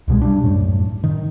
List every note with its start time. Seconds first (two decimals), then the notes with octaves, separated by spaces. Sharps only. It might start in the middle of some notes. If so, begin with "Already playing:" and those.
0.08 C2 B2 G#3
0.22 G3 D4
0.44 F#2 A2
1.04 D#3